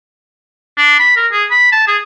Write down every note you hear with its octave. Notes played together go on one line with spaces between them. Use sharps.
D4
B5
A#4
G#4
B5
A5
G#4